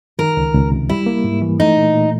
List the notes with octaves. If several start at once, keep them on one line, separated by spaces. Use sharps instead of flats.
D#3 A#4
C#2
C#2
C3
G3 E4
A#3
G#2
E3
A3 D#4
A#2
A#2